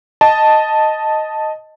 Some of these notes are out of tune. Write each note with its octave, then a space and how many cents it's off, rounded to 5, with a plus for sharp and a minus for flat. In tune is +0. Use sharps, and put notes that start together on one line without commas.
D#5 +0 A5 +0